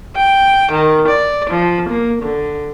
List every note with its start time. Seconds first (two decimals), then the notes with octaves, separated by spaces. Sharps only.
0.17 G5
0.70 D#3
1.07 D5
1.50 F3
1.88 A#3
2.22 D3